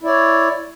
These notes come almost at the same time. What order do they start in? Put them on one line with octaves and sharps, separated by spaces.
E4 D5 C#5